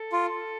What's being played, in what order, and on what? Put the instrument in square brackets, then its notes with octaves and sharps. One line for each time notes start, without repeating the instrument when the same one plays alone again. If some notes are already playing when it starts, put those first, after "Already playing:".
Already playing: [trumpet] A4
[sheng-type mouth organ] F4